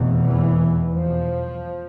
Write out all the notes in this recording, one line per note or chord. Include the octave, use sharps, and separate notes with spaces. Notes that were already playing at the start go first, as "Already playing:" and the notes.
Already playing: F1 E2 B2
E3
F3